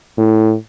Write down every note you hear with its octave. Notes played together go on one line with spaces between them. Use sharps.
A2